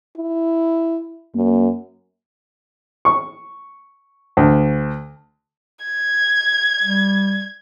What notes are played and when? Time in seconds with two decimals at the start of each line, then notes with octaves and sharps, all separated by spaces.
0.17 E4
1.35 F#2 A#3
3.05 C#6
4.37 D2
5.85 G#6
6.82 G3